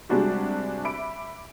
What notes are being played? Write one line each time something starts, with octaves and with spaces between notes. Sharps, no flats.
C3 G3 G#3 D4 F#4 G4
E5 B5 D6 D7